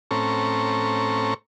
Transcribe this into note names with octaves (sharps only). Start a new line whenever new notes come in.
A2 C4 C#4 A4 A#5 C#6